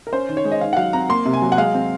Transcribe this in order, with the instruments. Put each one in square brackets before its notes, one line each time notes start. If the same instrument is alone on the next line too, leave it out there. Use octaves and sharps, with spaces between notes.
[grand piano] A#4
C#4 C5
D#3
C#5
G#3
D#5
D#3 F5
F#5
F#3 F5
C4 A#5
A#3 C6
C3
G#5
F#3
F#5
G#3 F5
C4